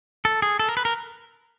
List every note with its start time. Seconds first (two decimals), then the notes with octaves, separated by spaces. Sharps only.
0.25 A4
0.42 G#4
0.59 A4
0.69 A#4
0.77 B4
0.85 A#4